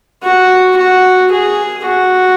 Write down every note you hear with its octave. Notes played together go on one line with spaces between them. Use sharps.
F#4
F#4
G#4
F#4